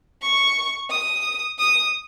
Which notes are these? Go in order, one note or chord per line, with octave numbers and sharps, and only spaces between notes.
C#6
D#6
D#6